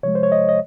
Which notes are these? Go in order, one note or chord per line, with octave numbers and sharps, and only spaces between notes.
C3 F3 G#3 C#5
C5
C#5
D#5
D#5